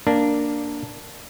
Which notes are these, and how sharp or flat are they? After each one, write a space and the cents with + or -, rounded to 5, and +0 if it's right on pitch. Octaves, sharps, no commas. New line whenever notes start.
A#3 +0 D4 +0